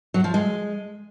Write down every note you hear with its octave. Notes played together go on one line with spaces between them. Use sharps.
F#3
F3
G#3